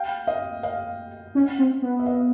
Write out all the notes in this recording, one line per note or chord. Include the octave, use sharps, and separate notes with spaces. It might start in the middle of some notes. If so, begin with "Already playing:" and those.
Already playing: F5 G5
D#5 F5
D#5 F5
C#4
C4
B3
E5
D#5 F5